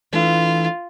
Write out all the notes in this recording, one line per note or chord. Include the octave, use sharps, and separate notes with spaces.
E3 A3 D4 F4